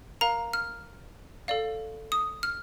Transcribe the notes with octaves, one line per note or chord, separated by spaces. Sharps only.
A#4 F5 A#5
F6
A4 D5 F5
D#6
F6